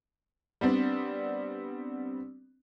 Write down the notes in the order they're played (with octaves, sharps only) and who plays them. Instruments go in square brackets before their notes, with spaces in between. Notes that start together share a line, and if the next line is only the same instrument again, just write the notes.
[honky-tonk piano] G3 B3 C4 D4